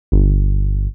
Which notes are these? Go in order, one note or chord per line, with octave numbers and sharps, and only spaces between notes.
G1